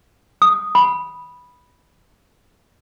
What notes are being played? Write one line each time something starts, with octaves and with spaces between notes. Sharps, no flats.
D#6
B5